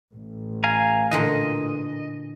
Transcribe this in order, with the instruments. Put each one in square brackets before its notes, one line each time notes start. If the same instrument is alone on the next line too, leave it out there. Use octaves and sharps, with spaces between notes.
[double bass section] A1
[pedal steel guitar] F5 G#5 A#5
[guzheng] A#2 D3 E3 [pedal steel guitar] D#5